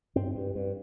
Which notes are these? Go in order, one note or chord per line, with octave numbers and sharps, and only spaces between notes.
G2 C4
G2
G2